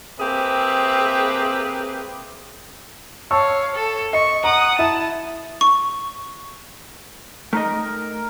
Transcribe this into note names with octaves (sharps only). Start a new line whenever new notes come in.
A#3 C4 G4 G#4 B4 E5
C#5 F5 A5 C#6 E6
A4
D#5 C#6
F#5 A#5 D#6
E4 A5
C#6
A3 D#4 A#4 D#5